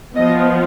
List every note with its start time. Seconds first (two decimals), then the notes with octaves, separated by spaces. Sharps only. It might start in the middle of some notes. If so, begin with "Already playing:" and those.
0.15 F3 B3 D#5